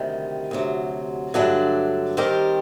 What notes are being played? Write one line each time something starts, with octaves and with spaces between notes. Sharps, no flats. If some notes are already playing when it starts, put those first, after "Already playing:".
Already playing: D2 C3 D#3 G3
D2 C3 F#3
G2 D3 F#3 A3 D4
D#3 G3 C4 G4 A#4